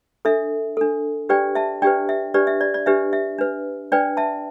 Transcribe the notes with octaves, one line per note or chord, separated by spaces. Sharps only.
D4 A4 E5
D4 A4
D4 G4 B4 D5 G5
E5 A5
D4 G4 B4 D5 G5
E5
D4 G4 B4 D5
E5
D5
D5
D4 G4 B4 E5
E5
D4 B4
D4 B4 D5 G5
E5 A5